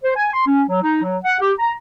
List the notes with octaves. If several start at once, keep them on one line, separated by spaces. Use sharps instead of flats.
C5
G#5
C6
C#4
F#3
D#4
F#3
F#5
G4
A#5